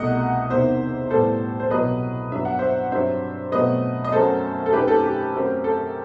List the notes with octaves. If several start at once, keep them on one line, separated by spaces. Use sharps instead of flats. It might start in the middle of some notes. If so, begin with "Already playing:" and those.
Already playing: C2 B2 A3 D#5 F#5
E2 C3 D#3 C5 E5
A2 G3 B3 A4 C5
C5
C2 B2 F#3 B4 D#5
G2 F#3 B3 E5
F#5
C5 E5
G2 F#3 C4 C5 E5
B2 F#3 A3 C4 B4 D#5
D#5
F#2 F#3 A3 C4 A4 C5
A4
F#2 D#3 A3 C4 G4 B4
A4
G4
F#2 F#3 A3 C4
A4